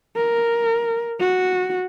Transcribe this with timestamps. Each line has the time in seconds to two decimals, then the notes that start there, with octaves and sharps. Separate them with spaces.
0.16 A#4
1.20 F#4